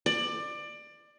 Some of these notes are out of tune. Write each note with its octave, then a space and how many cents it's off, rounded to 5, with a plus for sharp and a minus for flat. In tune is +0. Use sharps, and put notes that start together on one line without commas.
D5 +20